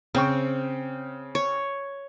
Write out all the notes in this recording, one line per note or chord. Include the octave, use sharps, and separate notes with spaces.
C#3 C4 G5 C#6
C#5